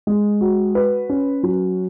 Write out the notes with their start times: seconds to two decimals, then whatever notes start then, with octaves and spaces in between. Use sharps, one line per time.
0.07 G#3
0.41 F#4
0.75 B4
1.09 C#4
1.43 F#3